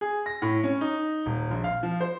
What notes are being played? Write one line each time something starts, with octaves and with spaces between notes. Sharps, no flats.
G#4
A#6
A2
C#4
D#4
D#1
A#1
F5
F3
C5